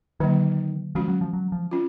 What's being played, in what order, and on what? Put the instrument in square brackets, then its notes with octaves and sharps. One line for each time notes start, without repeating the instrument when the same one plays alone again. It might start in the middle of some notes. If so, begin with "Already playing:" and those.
[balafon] D3 F#3 A#3 [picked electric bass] D#3
[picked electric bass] F3 [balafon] G#3 C#4 F#4
[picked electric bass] F#3
F3
F#3
F3
[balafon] C#4 F4